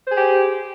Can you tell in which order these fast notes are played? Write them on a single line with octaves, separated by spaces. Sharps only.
C5 G#4 G4